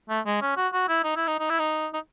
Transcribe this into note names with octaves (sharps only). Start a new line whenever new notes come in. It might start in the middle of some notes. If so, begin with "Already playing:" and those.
A3
G#3
C#4
F#4
F#4
E4
D#4
E4
D#4
D#4
E4
D#4
D#4